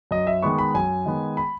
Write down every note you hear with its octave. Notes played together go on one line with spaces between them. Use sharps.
F#2 D#5
E5
D#3 G#3 B3 C#6
B5
F#2 G#5
D#3 G#3 B3
B5